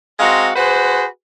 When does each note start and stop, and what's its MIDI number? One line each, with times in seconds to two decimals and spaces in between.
0.19 0.49 56
0.19 0.49 60
0.19 0.49 66
0.19 0.49 77
0.19 0.49 82
0.54 1.04 66
0.54 1.04 68
0.54 1.04 71
0.54 1.04 72